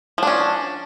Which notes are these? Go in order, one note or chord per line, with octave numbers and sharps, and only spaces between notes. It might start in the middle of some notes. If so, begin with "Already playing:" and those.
F3 C#4 D4